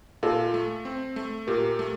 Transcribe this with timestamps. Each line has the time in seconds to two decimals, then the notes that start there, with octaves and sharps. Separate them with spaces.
0.23 A#2 F4 A4
0.54 A3
0.85 C4
1.16 A3
1.47 A#2 G4 A#4
1.79 A3